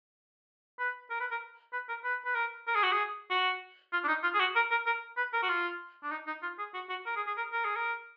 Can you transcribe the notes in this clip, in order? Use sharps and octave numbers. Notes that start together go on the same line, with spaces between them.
B4
A#4
B4
A#4
B4
A#4
B4
B4
A#4
A#4
G#4
F#4
G#4
F#4
F4
D4
D#4
F4
G#4
F#4
A#4
A#4
A#4
B4
A#4
F#4
F4
D4
D#4
D#4
F4
G#4
F#4
F#4
A#4
G#4
G#4
A#4
A#4
G#4
A#4